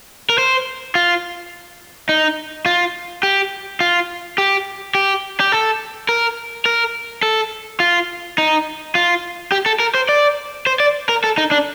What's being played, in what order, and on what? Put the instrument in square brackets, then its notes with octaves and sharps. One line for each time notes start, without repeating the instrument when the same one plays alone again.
[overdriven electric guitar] A#4
C5
F4
D#4
F4
G4
F4
G4
G4
G4
A4
A#4
A#4
A4
F4
D#4
F4
G4
A4
A#4
C5
D5
C5
D5
A#4
A4
D#4
D4